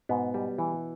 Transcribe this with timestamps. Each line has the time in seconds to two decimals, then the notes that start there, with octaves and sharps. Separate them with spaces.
0.09 G#2 B2 B3
0.34 G3
0.58 E3